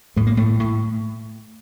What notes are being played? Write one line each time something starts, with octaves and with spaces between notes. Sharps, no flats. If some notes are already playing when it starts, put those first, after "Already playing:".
A2 A3
A#3
A2 A3
A2